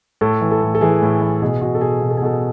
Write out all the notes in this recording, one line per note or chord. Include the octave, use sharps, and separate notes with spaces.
A2 A4
E3
A4
A2
A4
E3 G#4
A2
E3
B2 G#4
B2 F#4
A4
B2 G#4
B2
A4
G#4
B2 A4